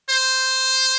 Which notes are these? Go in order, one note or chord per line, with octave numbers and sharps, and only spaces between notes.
C5